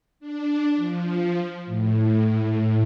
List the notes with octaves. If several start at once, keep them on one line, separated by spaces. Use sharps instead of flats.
D4
F3
A2